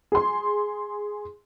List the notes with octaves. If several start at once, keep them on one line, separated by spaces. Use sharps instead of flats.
G#4 C6